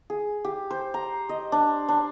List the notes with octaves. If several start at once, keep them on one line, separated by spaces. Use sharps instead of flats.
G#4
G4
C5
A#5
D#5
D4
D4